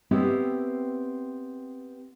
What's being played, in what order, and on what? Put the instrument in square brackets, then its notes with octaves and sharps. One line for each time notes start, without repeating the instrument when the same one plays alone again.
[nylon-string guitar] B3 C4 E4 G4 B4 C#5